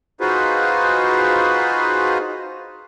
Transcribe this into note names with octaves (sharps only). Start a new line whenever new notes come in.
D#4 F4 F#4 G#4 B4 C5